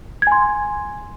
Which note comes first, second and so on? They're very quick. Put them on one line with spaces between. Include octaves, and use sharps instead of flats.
G#6 G#5 C6